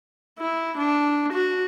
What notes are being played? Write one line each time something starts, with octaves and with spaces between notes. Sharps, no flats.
E4
D4
F#4